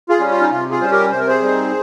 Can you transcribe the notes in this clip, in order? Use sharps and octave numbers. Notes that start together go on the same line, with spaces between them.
F4 G#4
G3 C#4
F4
D#4
C3 F4
F4 G#4
G3 C#4 C5
G4 A#4
C3 C5
A#4
G#4 C5
G3 C4 D#4